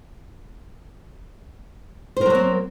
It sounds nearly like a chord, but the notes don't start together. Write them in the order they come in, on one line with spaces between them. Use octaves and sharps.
C5 A#4 F#3 A#3 C4